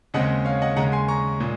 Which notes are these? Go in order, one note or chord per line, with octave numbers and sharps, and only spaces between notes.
D#2 C#3 G#3 C4 D#5 F#5
C#5 F5
D#5 F#5
D#2 C#3 G#3 F#5 A#5
G#5 C6
A#5 C#6
A#2 G#3